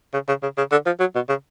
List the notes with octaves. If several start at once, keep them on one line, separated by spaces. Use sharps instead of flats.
C#3
C#3
C#3
C#3
D3
F3
F#3
B2
C#3